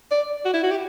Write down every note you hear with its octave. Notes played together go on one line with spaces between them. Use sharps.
D5
F#4
E4
F#4
G4